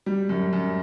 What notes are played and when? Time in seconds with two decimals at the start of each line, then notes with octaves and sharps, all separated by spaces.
0.06 G3
0.29 F#2
0.53 F#2